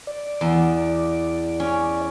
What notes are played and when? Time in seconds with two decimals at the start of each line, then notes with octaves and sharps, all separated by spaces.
0.07 D5
0.41 E2
1.60 C#4